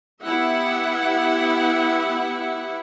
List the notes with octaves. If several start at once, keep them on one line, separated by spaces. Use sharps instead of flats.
B3 E4 G4 E5 F#5